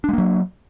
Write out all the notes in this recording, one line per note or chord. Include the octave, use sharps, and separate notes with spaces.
F#3 G#3 A#3 D4